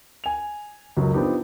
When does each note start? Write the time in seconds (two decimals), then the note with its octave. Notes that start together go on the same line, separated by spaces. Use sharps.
0.24 G#5 F7
0.97 C#2 F#2 F#3
1.14 F3 B3 C4 D4 D#4 G4